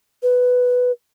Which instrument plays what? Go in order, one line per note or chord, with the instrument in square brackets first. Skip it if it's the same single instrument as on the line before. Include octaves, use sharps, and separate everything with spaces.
[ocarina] B4